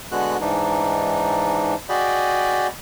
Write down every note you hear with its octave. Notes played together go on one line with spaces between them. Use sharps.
D3 G#3 B3 F#4 F#6
G#2 E3 D4 D#4
F#4 G#4 D5 D#5 G5 B5